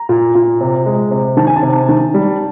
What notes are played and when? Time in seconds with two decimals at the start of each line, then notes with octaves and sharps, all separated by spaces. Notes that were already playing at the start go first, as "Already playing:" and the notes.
Already playing: A#5
0.09 A#2
0.35 A#2
0.61 C3
0.86 G#3
1.11 C3
1.37 D#3 A5
1.47 G#5
1.56 A5
1.62 C3
1.89 D#3
2.14 G3